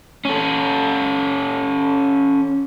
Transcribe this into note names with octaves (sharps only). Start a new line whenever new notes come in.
C#4 A4